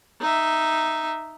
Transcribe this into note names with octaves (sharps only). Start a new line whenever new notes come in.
D#4 E5